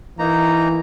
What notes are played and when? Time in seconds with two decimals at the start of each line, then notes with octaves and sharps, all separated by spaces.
0.19 E3 A#3 D#4 A#5